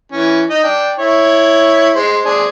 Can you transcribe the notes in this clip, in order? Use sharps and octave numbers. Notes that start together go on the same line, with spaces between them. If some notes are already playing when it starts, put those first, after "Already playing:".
E3 C#4
D#4 D#5
D4 G5
E4 C#5
G#3 C5
D4 G#4 C5